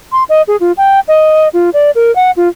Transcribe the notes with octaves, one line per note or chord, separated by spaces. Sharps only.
C6
D#5
G#4
F4
G5
D#5
F4
D5
A#4
F#5
F4